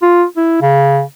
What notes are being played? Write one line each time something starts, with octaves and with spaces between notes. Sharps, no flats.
F4
E4
C#3